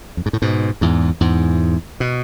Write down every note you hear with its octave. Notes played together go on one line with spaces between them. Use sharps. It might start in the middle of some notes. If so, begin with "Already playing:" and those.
F2
G#2
A2
G#2 B2
E2 G#2
E2 G#2
B2